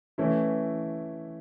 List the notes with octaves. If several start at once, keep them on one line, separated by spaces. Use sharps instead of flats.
E3 A3 C#4 E4